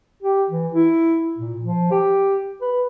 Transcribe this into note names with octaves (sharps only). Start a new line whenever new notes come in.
G4
E3
E4
A#2
F3
G4
B4